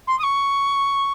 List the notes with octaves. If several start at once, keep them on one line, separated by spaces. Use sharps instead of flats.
C6
D#6
C#6